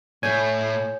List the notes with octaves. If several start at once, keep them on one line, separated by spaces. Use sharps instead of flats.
A2 A3 C#5 G#5 G6